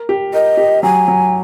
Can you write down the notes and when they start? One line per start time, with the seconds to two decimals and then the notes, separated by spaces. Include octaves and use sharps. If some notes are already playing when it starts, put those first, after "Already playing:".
Already playing: A#4
0.09 G4
0.34 A#4 D#5
0.57 G4
0.83 F#3 G#5
1.08 F#3